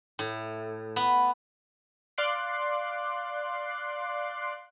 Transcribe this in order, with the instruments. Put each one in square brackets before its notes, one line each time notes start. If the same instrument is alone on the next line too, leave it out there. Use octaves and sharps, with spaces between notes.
[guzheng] A2
B3
[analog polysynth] D5 F5 C6 D6 F#6 C7